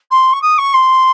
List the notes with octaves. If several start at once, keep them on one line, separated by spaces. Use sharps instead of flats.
C6
C#6
D#6
C#6
C6